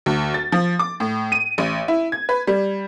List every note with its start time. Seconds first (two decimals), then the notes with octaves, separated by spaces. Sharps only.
0.06 D2
0.34 A6
0.52 F3
0.79 D6
1.00 A2
1.32 D#7
1.58 A1
1.88 E4
2.12 G#6
2.29 B4
2.47 G3